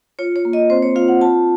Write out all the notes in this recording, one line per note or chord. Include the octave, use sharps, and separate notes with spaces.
F4 C#5
C#5
A#3
D#5
C4 C5
C#5
F4 F5
F#5
F4 A5